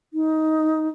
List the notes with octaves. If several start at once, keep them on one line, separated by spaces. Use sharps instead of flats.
D#4